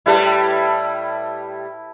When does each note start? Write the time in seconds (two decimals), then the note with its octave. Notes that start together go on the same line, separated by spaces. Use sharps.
0.06 A2 G3 E4 G4 B4 A5